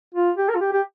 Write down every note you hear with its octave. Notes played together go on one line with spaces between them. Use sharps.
F4
G4
A#4
F4
G4
G4